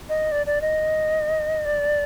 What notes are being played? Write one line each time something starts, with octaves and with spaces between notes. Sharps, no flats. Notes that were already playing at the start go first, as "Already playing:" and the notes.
D#5
D5
D5
D#5
D5